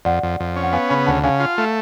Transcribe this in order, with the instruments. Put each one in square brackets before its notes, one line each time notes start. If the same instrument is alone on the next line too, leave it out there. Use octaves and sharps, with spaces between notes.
[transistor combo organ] F2 [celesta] D5 F#5
[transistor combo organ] F2
F2
C#4
[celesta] F#5
[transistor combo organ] B3 [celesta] F5 G#5
[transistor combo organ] C#3 [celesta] G#5 B5
[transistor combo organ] D2 [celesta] F#5 A5
[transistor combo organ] C#3 [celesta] F5 G#5
[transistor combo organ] F4
A3